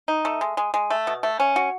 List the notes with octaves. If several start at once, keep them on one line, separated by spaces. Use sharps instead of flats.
D#4
A3
G#3
G#3
G#3
A3
B2
A3
C#4
F#4